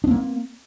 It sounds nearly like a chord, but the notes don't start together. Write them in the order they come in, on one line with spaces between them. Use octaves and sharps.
D4 C4 A#3